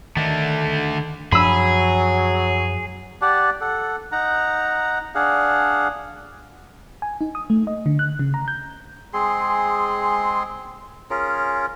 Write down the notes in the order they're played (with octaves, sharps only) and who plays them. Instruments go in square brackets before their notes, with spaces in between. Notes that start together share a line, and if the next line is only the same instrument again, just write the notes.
[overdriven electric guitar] D3 A3 [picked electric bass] D#3
[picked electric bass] F#2 F3 D4 [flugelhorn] F#3 [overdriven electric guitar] G#4 [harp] B5 E6
[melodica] G4 D5 F#5 A5
A4 F#5
D#4 F#5 A#5
D4 G#4 F5 F#5
[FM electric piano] G#5
D#4
D#6
A3
D#5
D3
F#6
C#3
A#5
G6
[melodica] G#3 C4 G#4 C6
C#4 F4 G#4 A#4